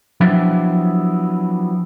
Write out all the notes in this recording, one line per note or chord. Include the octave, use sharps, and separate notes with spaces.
F3 F#3 B3 D4 E4 G4